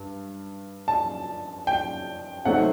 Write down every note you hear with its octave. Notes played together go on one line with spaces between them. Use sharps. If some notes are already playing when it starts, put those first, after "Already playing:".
Already playing: G2
A5
G5
C3 F#3 A3 C4 D#4 F#5